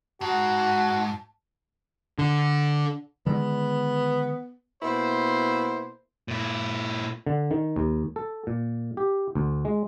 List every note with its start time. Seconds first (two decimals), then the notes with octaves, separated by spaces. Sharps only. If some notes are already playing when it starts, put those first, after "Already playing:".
0.21 G#2 F#4 A5
2.18 D3
3.26 D3 D#3 G#3 B3
4.83 B2 A#3 E4 C5
6.28 A#2 E4
7.27 D3
7.51 D#3
7.76 D#2
8.16 A4
8.47 A#2
8.97 G4
9.35 D2
9.65 G#3